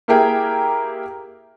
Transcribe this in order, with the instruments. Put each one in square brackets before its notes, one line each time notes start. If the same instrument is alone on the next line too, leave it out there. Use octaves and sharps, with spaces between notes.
[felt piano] A#3 E4 G4 G#4 A#4 G5